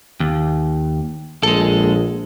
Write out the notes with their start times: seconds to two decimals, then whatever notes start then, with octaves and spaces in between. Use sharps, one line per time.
0.20 D#2
1.43 A#1 G#3 A4